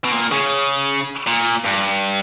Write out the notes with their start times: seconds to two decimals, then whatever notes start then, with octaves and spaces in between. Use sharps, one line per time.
0.04 B2
0.12 A#2
0.31 C#3
1.27 A#2
1.65 G2